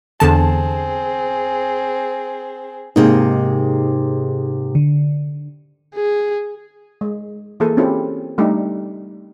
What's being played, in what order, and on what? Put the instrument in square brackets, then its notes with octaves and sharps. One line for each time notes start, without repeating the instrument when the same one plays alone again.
[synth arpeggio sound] E2 D3 A5 [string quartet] C4 G#4
[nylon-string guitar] G#2 C3 A#3 [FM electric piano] D#4 G#4
[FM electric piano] D3
[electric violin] G#4
[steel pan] G#3
E3 A#3 G#4 A4
C4 C#4 E4 F4 G4 A4
G3 A3 D4 D#4 G4